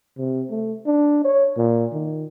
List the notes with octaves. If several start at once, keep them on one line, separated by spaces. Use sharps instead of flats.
C3
A3
D4
C#5
A#2
D#3